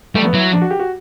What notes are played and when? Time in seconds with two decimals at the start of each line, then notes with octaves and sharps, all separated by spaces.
0.15 G3 A3
0.25 B3
0.34 F#3 E4
0.53 D4
0.62 F#4
0.70 G4
0.79 F#4